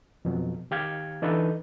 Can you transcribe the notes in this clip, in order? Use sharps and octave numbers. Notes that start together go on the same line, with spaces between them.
F2 B2 F3 F#3
D#3 G4 F5 G#6
E3 D4 D#4 A4 B4